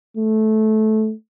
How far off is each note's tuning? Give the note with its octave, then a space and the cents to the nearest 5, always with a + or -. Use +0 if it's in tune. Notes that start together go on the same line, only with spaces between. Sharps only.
A3 -15